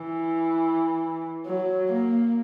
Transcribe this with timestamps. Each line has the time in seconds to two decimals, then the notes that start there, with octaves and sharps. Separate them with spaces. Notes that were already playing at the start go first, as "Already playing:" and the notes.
Already playing: E3
1.46 F#3
1.92 A#3